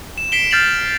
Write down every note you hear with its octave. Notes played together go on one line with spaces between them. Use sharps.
E7
B6 C7 D7 E7 G7
F6 G6 A6 C7 F7 F#7